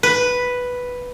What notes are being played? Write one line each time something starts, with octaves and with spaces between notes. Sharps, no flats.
B4